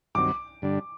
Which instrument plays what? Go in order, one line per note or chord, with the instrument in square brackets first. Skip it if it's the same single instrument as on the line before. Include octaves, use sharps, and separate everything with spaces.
[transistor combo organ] G2 D#3 F#3 C4 [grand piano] D6
[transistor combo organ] G2 D3 G3 D4